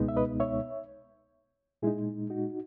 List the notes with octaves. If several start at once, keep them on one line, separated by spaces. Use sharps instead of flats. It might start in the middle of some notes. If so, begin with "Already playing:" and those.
Already playing: C#2 B2 G#3 B3 D#4
E5
B4 D#5
C#5 E5
A#2 G#3 D#4 E4 G#4
D#4 F#4